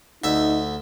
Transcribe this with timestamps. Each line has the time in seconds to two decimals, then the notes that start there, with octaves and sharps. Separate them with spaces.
0.24 D2 D#4 E5